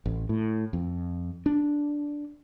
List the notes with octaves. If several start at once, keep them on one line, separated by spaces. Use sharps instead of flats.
A1
A2
F2
D4